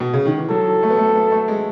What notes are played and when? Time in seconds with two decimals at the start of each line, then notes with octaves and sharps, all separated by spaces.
0.00 B2
0.13 C#3
0.25 D#3
0.38 E3
0.50 F#3 A4
0.83 A3
0.90 B3
0.98 A3
1.15 B3
1.32 A3
1.48 G#3